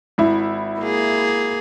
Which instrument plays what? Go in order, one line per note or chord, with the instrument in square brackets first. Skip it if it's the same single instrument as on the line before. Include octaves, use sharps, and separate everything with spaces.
[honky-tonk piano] G#1 E4
[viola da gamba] A#3 G#4